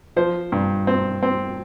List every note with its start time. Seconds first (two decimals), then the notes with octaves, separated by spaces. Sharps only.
0.16 F3 C5
0.52 G2
0.87 C4
1.23 C4